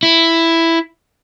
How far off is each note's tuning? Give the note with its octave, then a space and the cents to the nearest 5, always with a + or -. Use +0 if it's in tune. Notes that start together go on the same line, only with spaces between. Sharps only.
E4 +5